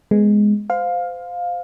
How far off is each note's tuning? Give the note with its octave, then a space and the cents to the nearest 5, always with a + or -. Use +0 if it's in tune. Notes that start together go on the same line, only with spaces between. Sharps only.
G#3 +0 B3 +5
C5 -25 F5 +15